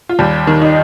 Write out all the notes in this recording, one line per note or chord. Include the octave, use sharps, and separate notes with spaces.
F4
D#2 G3 G4
D#3
D#4